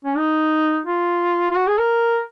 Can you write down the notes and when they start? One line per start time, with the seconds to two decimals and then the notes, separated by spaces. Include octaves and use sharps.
0.05 C#4
0.17 D#4
0.86 F4
1.51 F4
1.56 F#4
1.67 G#4
1.78 A#4